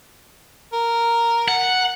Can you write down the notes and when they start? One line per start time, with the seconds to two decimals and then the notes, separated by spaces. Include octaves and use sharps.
0.73 A#4
1.48 F#5